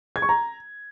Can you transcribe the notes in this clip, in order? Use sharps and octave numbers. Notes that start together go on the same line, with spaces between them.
G#6
C#6
A#5